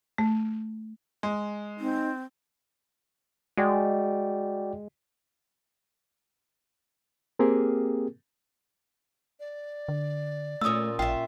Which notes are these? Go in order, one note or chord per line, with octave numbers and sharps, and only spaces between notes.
A3
G#3
C4 D#4
G#3 F#4 D5 G5
A#3 C4 G4 G#4 A#4
D5
D3
A#2 A3 C#4 F4 D#6 E6
A1 F4 E5 G5